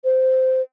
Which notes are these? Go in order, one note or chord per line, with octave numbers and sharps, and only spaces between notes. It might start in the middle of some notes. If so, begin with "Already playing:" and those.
C5